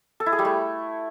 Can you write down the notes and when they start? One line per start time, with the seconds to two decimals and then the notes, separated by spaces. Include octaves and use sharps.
0.20 A4
0.26 E4
0.32 G#4
0.39 G3
0.45 A3